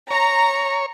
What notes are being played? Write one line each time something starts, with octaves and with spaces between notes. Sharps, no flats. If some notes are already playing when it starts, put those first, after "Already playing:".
C#5 A#5